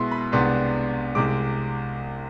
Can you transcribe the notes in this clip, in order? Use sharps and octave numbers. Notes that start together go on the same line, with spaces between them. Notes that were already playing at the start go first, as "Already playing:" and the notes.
Already playing: B2 G#3 B3 E4 C6
B5
C2 C3 G#3 B3 D4 C6
C2 C3 G#3 D6